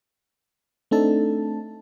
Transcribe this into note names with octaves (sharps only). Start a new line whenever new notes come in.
A3 C4 D4 D#4 A4 A5